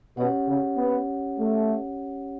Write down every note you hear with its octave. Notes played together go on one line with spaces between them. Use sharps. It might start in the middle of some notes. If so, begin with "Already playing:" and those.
B2 C#4 G4 C#5 F#5
C#3
B3
A3